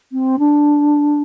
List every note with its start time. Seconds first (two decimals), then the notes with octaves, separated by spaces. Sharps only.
0.12 C4
0.39 D4